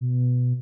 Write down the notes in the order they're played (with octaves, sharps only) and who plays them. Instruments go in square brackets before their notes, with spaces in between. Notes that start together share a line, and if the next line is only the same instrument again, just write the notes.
[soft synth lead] B2